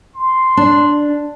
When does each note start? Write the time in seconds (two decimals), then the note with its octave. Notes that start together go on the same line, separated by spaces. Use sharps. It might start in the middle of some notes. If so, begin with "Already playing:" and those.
0.15 C6
0.57 D4